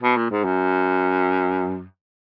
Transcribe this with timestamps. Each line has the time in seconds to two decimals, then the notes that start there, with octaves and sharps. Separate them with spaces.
0.02 B2
0.17 A#2
0.31 G#2
0.45 F#2